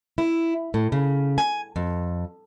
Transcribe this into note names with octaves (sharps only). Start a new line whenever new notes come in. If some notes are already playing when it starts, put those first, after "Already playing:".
E4
A2
C#3
G#5
F2